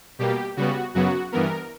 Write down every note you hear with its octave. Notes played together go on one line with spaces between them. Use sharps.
B2 G3 A#3 G4
C#3 G3 B3 F#4
F#2 C#3 F#3 B3 F#4
G2 E3 B3 A#4